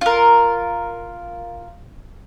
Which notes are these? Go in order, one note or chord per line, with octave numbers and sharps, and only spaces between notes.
F4 A#4